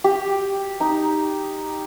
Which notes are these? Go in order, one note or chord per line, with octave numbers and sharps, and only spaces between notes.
G4
D#4